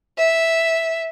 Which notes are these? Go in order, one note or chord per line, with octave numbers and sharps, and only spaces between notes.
E5